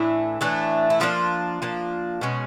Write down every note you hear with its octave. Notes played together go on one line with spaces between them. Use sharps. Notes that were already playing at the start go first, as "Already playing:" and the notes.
Already playing: A2 E3 A3 D4 E4
A2 E3 A3 D4
E4
F3 A#3 D4 F4
F3 A#3 D4
B2 G#3 C#4